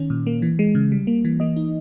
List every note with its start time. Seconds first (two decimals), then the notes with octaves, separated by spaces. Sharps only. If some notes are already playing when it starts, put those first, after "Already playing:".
Already playing: D#3 C#4
0.10 A#2
0.27 A#3
0.42 E3
0.59 G#3
0.75 C#3
0.92 G3
1.07 A#3
1.25 E3
1.40 A#3 D#5
1.56 D#4